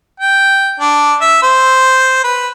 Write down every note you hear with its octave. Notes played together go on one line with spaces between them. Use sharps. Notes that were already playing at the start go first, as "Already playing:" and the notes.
G5
D4
E5
C5
B4